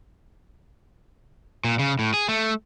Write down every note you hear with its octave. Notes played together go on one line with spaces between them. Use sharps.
A#2
C#3
A2
G#4
A3